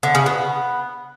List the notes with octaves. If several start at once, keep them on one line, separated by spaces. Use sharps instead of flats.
D3
C#3
B3